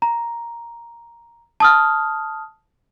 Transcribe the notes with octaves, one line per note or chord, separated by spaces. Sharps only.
A#5
A5 D#6 F6